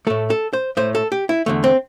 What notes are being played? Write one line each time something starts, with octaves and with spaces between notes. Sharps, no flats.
A2 A3 A4
A4
C5
A2 A3 C5
A4
G4
E4
E2 D3 A3
C4